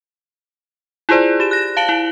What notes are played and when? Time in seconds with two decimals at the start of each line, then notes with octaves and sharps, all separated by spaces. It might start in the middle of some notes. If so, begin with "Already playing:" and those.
1.09 E4 F4 G#4 C5 D5
1.40 G4 E7
1.51 F#6 A#6
1.77 F5 A5 D7 F#7 G7
1.89 E4